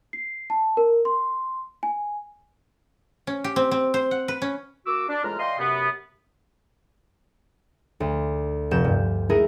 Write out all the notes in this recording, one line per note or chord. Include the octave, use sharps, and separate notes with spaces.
C7
A5
A#4
C6
G#5
C#4
G4
C4
C4
C5
F#5
B4
C#4
A#3 F#4 D6 E6
D4
E2 A2 G#3 F4 A#5 F6
E3 D5 D#5 F5 G5 C6
F#2 C3 B3
D2
F1 G6 E7
G2
G#3 A3 D#4 E4 G#4 A#4